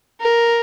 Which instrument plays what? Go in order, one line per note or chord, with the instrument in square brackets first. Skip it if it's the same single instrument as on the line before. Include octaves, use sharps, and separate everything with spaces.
[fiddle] A#4